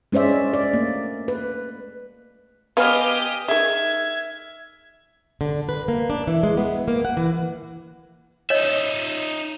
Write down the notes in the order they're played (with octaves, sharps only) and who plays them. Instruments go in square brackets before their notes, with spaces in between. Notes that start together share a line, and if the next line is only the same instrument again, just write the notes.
[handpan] G#3 C#4 C5 D5 E5
D5
A3 A#3
B4
[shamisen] B3 B4 [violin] G4 D#5 [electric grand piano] F5 G#5 F6
[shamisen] D#3 G#4 [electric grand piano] E5 [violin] G#6
[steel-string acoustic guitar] D3
B4
A#3
D4
E3
G#3
B3
A#3
F#5
E3
[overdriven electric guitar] D#4 E5 [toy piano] C#5 D#5